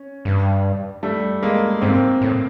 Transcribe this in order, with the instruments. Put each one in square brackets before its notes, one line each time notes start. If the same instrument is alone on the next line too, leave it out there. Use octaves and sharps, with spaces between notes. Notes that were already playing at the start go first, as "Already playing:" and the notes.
Already playing: [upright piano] C#4
[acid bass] G2
[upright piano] G3 A3
G#3 A#3
[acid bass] G#2 [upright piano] A#3 C4
[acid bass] A2